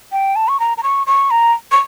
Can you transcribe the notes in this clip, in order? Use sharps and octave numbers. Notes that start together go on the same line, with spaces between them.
G5
A5
C#6
A#5
A#5
C#6
C#6
A#5
C#6